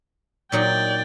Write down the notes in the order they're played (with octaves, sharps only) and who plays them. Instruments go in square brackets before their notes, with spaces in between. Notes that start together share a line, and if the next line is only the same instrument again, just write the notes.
[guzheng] A#2 F#3 D#4 [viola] D5 G5